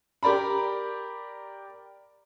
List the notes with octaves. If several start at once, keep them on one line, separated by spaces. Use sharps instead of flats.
G4 A#4 D5 A#5 B5